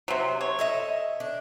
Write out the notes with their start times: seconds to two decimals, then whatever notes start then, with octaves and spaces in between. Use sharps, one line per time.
0.08 C3 F#3
0.41 C#5
0.59 A4 D#5 E5
1.20 D4